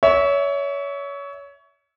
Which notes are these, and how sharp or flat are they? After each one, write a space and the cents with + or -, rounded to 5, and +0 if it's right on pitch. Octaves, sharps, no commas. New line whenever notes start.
C#5 +25 E5 -15